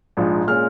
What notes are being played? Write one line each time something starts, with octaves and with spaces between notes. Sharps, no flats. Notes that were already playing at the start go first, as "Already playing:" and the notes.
A#1 G#2 F3
A#2 G#3 C#4 F6